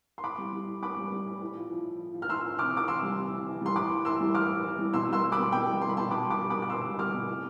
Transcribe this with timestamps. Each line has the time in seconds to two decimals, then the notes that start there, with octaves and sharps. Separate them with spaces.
0.18 C6
0.24 A2 B5 D6
0.38 G3
0.53 G3
0.67 A2
0.82 A2 B5 D6
0.97 G3
1.12 G3
1.27 A2
1.41 A2
1.56 F3
1.70 F3
1.85 A2
2.00 A2
2.14 F3
2.22 F6
2.29 F3 C6 E6
2.44 A2
2.59 C3 D6 F6
2.73 C3 D6
2.87 E3 C6 E6
3.03 G3
3.17 C3
3.32 C3
3.47 E3
3.61 G3 C6
3.76 A2 B5 D6
3.90 A2
4.05 E3 C6 E6
4.21 G3
4.34 A2 D6 F6
4.49 A2
4.65 E3
4.79 G3
4.93 B2 C6 E6
5.09 G3 C6 E6
5.23 G3
5.32 B5 D6
5.38 B2
5.52 B2 G5 B5
5.66 G3
5.82 G3 C6
5.89 B5
5.96 B2 A5 C6
6.11 B2 B5 D6
6.26 G3 B5 D6
6.41 G3
6.50 B5 D6
6.55 B2
6.62 D6
6.70 B2 C6 E6
6.84 G3
6.99 G3 D6 F6
7.14 B2
7.28 C3